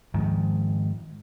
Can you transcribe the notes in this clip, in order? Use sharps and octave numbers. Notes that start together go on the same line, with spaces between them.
G#2 D#3 F3